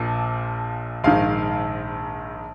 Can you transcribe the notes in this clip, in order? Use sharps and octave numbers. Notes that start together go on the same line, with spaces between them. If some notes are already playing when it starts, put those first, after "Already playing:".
Already playing: A#1 A#2 F3
A#1 G#2 D#3 F5